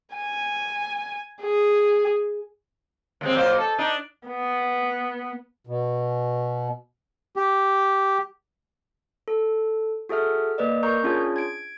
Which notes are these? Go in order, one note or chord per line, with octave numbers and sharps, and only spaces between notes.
G#5
G#4
D#2 G#3 C4
F#3 A#3 C5
A4
D4 D#4
B3
B2
G4
A4
F#4 G#4 A4 E5 F6
A#3 B4 D5 D#5
A#4 A#5 C#6 G6
C#4 D4 F4 G#4 C#5
G#6 D7